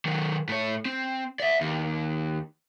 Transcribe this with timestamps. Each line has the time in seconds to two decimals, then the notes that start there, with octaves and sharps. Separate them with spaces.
0.05 D#3 F#3
0.49 A2 C#5
0.85 C4
1.40 D5 E5
1.61 D#2